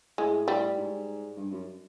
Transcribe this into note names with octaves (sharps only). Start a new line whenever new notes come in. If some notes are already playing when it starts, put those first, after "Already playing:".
A2 G#3
G3
G#2
G2
F#2